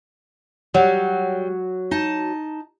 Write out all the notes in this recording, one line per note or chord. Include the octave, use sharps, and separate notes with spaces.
F#3 G3
D#4 A5